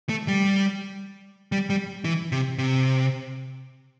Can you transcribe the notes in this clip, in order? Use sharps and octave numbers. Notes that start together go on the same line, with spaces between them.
A3
G3
G3
G3
E3
C3
C3